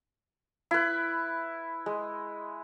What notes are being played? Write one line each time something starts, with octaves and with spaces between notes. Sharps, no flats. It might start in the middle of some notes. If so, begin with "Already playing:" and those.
E4 B4
G#3